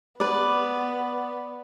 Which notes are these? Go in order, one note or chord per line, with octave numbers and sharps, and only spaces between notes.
B3 B4 D5